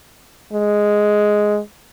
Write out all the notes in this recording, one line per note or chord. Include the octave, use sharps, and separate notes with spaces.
G#3